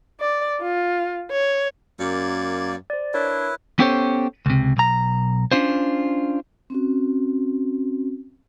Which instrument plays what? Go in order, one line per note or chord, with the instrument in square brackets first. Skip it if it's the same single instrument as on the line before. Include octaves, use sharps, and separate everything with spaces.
[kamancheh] D5
F4
C#5
[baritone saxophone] F#2 [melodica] A#3 D5
[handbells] C5 D5
[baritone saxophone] D4 [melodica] E4 B4 [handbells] A#4 C#5
[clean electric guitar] B3 C#4 G4 A4 C5 C#5
C#2 C3
B1 A#5
C#4 D4 F4 C5
[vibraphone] C4 C#4 F#4